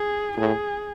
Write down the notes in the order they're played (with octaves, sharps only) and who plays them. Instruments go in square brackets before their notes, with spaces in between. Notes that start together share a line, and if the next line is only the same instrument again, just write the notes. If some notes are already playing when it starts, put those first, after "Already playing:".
Already playing: [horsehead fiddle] G#4
[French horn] A2 [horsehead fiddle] G#4